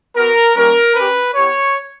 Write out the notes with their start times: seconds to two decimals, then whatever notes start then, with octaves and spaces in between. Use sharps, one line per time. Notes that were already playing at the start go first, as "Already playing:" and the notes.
0.16 B3 F#4 A#4
0.56 G3 A#3 C#4 A#4
0.96 C#4 G4 B4
1.35 B3 E4 G4 C#5